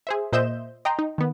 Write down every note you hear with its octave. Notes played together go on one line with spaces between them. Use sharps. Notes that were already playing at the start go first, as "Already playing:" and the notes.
G#4 C5 E5
A#2 C5 D#5 E5 G6 E7
D#5 G5 A#5 C6
D#4
D#3 B3